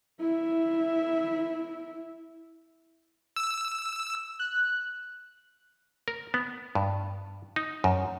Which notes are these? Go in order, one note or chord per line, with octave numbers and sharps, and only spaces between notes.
E4 E5
E6
F#6
A#4
B3
G2
D#4
F#2